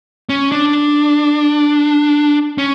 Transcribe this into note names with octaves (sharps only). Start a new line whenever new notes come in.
C#4
D4
C#4